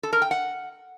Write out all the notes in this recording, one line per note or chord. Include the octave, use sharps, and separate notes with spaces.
A4
A#4
G5
F#5